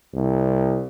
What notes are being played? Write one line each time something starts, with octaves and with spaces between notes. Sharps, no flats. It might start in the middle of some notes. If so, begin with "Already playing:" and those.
C2